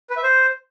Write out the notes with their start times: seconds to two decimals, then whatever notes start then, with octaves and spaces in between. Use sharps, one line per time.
0.10 B4
0.17 E5
0.23 C5